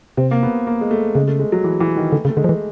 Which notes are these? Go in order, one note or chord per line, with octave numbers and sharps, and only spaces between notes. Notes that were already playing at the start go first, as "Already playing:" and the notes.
C3 C4
A#3
B3
A#3
G#3
A3
C#3 G#3
A3
G#3
F#3
E3
E3
D#3
D3 A3
C#3
A3
D3 G#3
F3
E3